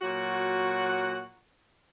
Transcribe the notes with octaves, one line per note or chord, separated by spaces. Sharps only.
A#2 F#3 F#4